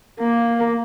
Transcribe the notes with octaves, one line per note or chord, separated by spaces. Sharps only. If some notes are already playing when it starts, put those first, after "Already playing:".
A#3